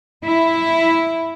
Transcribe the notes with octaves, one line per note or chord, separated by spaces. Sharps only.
E4